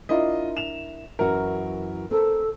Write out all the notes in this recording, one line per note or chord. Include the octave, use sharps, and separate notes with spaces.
D4 E4 F4 A#4 D#5
E7 F7
F#2 E3 F#4 A#4
C4 A4 A#4